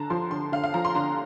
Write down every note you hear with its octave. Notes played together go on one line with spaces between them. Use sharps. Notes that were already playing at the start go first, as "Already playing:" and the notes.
Already playing: D3 A5 A#5
F3 C6
D3 C6
D3 F5
F5
F3 A#5
C6
D3 A#5